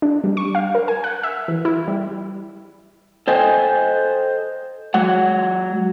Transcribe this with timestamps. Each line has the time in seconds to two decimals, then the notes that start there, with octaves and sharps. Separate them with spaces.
0.02 D4
0.24 G3
0.37 C#6
0.55 F5
0.75 A#4
0.88 G#5
1.04 F#5
1.23 E5
1.48 E3
1.65 E4
1.88 G3
3.28 A4 C5 D#5 G5 G#5
4.94 F#3 G#3 F#5